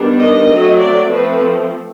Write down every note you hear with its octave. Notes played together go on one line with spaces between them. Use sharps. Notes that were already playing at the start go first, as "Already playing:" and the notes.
Already playing: D#3 G3 B3 D4
D#5
F#3 A3 C4
D5
F3 A3 C4 B4